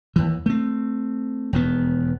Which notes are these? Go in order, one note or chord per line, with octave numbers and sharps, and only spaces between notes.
D#2 E3
A3 C4
E1 D#2 B3